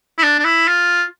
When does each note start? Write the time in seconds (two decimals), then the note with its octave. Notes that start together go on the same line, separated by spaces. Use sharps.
0.18 E4
0.23 D4
0.39 D4
0.45 E4
0.68 F4